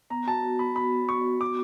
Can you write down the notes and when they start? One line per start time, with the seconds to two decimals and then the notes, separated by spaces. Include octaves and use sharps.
0.10 B3 A#5
0.27 F#4 A5
0.44 F#4
0.59 B3 B5
0.75 F#4 B5
0.92 B3
1.09 F#4 C#6
1.24 F#4
1.41 B3 D6